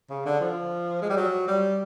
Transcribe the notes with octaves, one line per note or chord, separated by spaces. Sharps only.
C#3
D3
F3
G#3
G3
F#3
G3